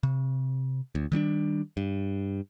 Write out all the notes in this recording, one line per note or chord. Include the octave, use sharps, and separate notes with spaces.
C3
D2
D#3 G3 C#4 D4
G2